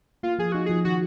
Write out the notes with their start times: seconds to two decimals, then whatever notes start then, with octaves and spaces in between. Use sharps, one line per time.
0.23 A#3 F4
0.39 F3 G#4
0.52 D#4 F#4
0.66 F3 G#4
0.85 D#3 F#4